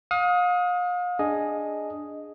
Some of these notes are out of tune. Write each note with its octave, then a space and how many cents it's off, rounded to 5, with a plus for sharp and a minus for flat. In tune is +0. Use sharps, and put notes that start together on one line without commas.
F5 +40 D#6 +20
D4 +0 G#4 +0 D#5 +0